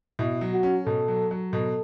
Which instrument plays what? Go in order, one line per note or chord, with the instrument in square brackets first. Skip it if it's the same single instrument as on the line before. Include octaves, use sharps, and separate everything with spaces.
[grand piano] B2 [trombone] E4
[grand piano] F#3
[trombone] F#4
[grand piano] C#4
[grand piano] B2 [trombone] A4
[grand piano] F#3
F#3
[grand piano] B2 [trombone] A4